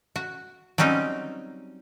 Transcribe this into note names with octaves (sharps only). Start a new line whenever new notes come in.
F#4
F#3 G3 C4 C#4 D#4